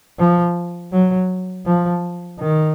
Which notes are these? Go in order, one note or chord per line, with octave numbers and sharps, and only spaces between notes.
F3
F#3
F3
D#3